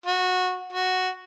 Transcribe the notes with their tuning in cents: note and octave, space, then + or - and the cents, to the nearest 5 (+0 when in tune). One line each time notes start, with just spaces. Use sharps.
F#4 -15
F#4 +0